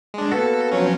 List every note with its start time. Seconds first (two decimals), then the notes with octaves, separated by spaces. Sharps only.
0.14 G#3 D4
0.31 A#3 B3 F#4 A4
0.71 F3 F#3 C#4